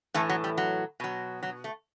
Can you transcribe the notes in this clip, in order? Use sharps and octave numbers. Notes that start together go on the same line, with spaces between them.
A2 E3 A3
F#3
G3
F#3
B2 F#3
F#3
A3